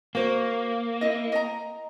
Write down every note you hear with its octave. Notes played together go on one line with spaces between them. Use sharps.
A#3 F#4 C5
E4 D#5
D#5 A#5